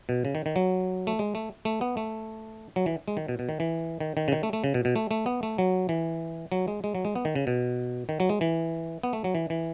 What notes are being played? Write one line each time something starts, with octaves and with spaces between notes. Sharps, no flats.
B2
C#3
D#3
D#3
F#3
A3
G#3
A3
A3
B3
A3
F#3
E3
G#3
D#3
B2
B2
D#3
E3
D#3
D#3
C#3
D#3
A3
A3
C#3
B2
B2
A3
A3
B3
A3
F#3
E3
F#3
G#3
G#3
F#3
G#3
B3
D#3
C#3
B2
D#3
F#3
G#3
E3
B3
A3
F#3
E3
E3